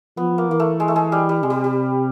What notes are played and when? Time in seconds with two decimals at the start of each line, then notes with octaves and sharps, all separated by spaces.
0.17 F3 B3
0.38 A#3
0.49 E3 A#3
0.60 A3
0.80 G#3
0.88 A3
0.96 G#3
1.12 G3
1.29 G3
1.43 C3 G#3
1.50 G3
1.64 G3